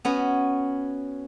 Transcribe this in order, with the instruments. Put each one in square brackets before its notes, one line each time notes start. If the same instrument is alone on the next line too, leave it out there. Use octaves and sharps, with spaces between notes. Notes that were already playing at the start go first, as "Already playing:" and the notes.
[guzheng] B3 C#4 F#4